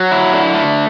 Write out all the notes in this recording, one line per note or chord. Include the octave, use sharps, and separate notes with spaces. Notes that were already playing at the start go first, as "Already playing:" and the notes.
Already playing: F#3
E4
D3
A3